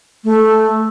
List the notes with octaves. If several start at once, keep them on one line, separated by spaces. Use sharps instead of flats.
A3